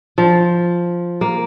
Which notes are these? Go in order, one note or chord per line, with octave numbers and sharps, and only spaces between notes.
F3
A#3